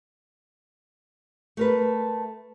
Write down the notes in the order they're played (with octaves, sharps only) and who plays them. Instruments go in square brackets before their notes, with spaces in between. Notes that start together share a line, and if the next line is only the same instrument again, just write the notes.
[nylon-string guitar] A3 A#4 B4